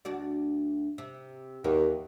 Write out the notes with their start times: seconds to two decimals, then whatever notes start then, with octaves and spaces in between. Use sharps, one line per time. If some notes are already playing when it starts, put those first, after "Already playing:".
0.05 D2 F#4 D5
0.98 C3
1.64 D#2 E3 F#4 A#4